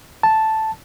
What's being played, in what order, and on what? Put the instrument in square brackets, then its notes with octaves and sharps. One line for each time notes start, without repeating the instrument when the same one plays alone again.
[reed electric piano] A5